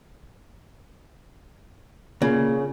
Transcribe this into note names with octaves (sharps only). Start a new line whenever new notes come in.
A#2 C#3